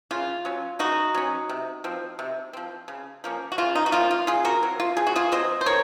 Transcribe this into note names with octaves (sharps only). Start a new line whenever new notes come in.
C#3 F4
F#3 C#4
C#3 D#4 F#4
F#3 C#4
C3
F3 C4
C3
F3 C4
C#3
F3 A#3 C#4
F#4
C#3 F4
D#4
F#4
F3 A#3 C#4 F4
F4
C#3 F4 G#4
F#4 A#4
F#3 C4
F4
C#3 G#4
F#4
F4 G#4
F#3 C4 C5 D#5
C5
D#3 A#4 C#5